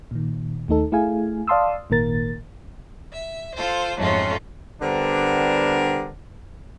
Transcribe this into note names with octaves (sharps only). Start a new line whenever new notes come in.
A#2 D#3
D#2 A3 D#4 A4
A3 E4 G#4 F5 G#5
D5 F5 A5 C6 D#6 E6
G#1 A#2 D#3 A#3 A#4 A6
E5
F4 A4 C5
F2 G#2 F#3 A3 C#4 F4
D3 G3 B3 C4 D4 A#4